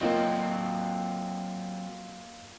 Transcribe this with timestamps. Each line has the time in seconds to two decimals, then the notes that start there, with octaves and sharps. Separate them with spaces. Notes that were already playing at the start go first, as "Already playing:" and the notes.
0.01 F#3 A#3 C4 F4 D#5